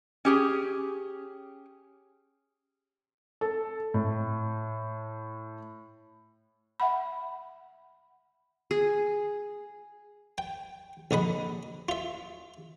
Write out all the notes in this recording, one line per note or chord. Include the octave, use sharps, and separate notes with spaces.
C#4 G4 G#4
A4
A2
E5 F#5 B5
G#4
G5
A#1 D3 D#5 B5
F4 E5